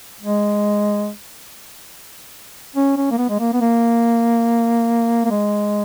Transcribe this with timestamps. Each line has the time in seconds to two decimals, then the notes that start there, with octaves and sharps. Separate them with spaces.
0.21 G#3
2.76 C#4
2.97 C#4
3.11 A#3
3.18 B3
3.29 G#3
3.39 A#3
3.53 B3
3.61 A#3
5.25 A#3
5.31 G#3